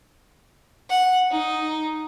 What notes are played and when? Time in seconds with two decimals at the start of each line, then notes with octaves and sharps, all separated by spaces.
0.89 F#5
1.31 D#4